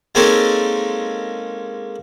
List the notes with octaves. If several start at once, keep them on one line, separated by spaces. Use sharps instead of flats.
G#3 A#3 C4 C#4 D#4 A4